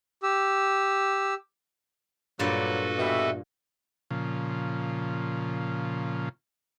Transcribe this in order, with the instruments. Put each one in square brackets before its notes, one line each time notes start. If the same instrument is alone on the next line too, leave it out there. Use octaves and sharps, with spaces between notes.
[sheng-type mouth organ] G4 E6
[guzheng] G2 A#2 D5 [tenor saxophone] F#3 [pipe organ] F#4 A4 B4
[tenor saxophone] B2 [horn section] E3 G3 E5
[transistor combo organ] A#2 C#3 F3